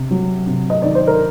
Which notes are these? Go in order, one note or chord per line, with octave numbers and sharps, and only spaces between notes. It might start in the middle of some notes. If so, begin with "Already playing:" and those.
Already playing: C3
F#3
C3
D#5
D#3 D5
C5
A#4